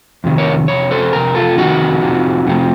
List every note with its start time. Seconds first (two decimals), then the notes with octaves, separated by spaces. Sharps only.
0.24 F2 C3 D#3
0.38 A#4 C#5
0.68 F2 C3 C#5
0.91 A4 C5
1.13 F2 C3 A#4
1.35 F4 A4
1.57 F2 C3 D#3 D#4 F#4
2.02 F2 C3 F3
2.47 F2 C3 F3